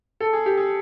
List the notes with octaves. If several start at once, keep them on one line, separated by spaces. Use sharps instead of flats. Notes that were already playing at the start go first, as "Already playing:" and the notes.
A4
G#4
G4
G#4